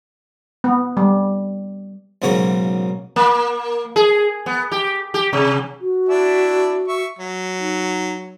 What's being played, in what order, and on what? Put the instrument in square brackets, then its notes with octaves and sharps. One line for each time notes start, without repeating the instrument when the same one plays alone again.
[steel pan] B3
G3
[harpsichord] B1 G#2 C#3 F#3 A#3 C#5
[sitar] A#3
G#4
B3
G4
G4
C3
[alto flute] F#4
[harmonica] D4 E4 E5
E5 C#6
F#3
[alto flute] D#4